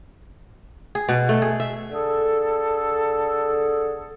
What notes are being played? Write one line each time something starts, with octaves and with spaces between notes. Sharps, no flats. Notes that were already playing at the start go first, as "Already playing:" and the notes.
G#4
B2
A3
G#4
E5
D3 G#4 A4